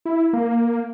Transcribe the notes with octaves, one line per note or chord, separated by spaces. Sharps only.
E4
A#3